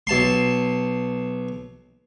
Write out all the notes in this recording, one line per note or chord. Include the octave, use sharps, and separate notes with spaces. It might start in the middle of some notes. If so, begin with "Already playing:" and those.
B1 A5 C6